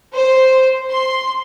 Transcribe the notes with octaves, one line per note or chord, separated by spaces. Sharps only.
C5
C6